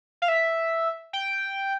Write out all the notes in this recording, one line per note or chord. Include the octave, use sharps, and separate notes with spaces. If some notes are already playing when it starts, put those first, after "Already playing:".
F5
E5
G5